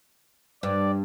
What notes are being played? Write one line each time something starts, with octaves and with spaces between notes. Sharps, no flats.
G2 D5